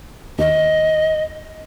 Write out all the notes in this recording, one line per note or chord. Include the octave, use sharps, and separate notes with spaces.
D#2 D#5